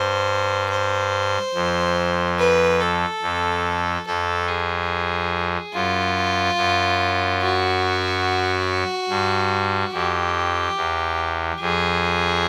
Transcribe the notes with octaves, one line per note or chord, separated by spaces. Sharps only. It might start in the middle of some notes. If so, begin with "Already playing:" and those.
Already playing: G2 C5
C5
F2
B4
A4
F2
F2 A4
G#4
F#2 F4
F#2
F#4
G2
F2 G4
E2
F2 G#4